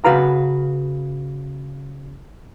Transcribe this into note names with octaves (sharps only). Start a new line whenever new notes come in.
C#3 F#4 B4 F5 A#5